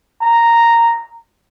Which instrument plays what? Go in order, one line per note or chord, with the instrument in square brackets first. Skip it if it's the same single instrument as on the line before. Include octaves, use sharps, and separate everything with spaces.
[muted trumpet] A#5